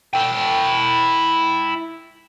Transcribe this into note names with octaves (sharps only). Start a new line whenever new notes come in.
E4 G5